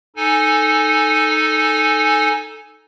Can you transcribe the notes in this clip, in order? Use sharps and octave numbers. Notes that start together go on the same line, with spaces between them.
D#4 A4 G#5